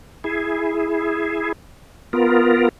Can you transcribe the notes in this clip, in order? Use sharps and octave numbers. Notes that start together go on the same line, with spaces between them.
E4 G#4
B3 F4 A#4